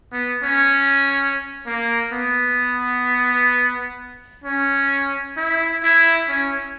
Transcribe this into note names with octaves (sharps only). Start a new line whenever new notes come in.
B3
C#4
A#3
B3
C#4
E4
E4
C#4